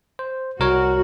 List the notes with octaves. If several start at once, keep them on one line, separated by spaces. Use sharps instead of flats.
C5
C2 F#4 A#4 C#5